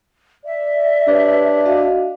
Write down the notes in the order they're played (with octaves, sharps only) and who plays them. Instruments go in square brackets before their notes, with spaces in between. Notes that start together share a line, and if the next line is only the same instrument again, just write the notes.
[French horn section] D5 [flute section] E5
[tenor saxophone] D4 [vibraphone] G4 B4 C#5
[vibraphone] F#4 D#5 F5